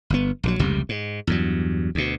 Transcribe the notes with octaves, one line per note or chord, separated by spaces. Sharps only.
G1 B3
A#1 C#3 F#3
F1 C#2 C3 G3
G#2
E2 G2 F#3
D2 B2